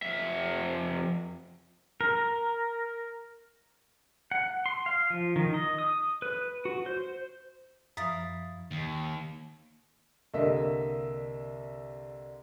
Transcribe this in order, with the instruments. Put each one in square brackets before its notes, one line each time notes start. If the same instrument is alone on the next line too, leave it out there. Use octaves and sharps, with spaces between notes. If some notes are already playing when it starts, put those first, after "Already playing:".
[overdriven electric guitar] F2 E5
[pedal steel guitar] A#4
F#5
C6
F5
F3
D#3
D#5
D#6
B4
F#4
C5
[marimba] F#2 F3 [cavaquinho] E4 C#5 F5 [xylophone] D#6 A6 B6
[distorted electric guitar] D#2
[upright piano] C2 D3 A#3 D#5 E5